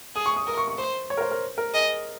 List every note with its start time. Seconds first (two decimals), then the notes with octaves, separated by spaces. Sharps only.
0.15 G#4 D#6
0.26 C#6
0.36 D#6
0.47 A#4 D#6
0.57 C#6
0.68 C#6
0.78 C5 C6
1.10 C#5
1.17 A#4
1.21 C5
1.31 A#4
1.58 A#4
1.73 G#4 D#5